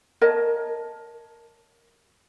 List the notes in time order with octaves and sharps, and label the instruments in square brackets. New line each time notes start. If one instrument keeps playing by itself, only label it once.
[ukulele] A#4 C#5 D#5 A5